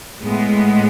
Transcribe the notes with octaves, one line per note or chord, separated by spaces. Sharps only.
A2 G#3 B3